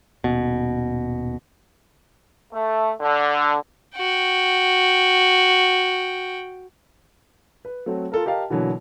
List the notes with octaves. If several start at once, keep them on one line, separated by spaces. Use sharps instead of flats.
D#1 B2
A3
D3
F#4 G5
B4
F#3 A3 C4 F#4
F4 A4 A#4
G4 A#4 D#5 F5 A5
B2 D3 E3 F#3 A#3